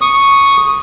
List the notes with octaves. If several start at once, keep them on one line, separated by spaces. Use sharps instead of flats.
C#6 D#6